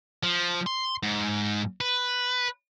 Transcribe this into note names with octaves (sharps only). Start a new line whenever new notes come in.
F3
C6
G#2
B4